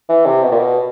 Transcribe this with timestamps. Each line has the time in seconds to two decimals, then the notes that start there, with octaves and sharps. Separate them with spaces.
0.09 E3
0.26 C3
0.43 B2
0.51 A#2
0.59 B2